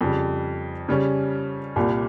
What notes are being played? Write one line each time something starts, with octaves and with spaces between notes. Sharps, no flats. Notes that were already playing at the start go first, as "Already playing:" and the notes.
F2 C#3 G3
C#3 G3 C#4
C2 A#2 G3